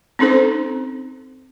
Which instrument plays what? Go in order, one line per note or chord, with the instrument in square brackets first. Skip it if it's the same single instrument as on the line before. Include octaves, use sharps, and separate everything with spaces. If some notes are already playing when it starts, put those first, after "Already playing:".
[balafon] C4 C#4 D#4 A4 C5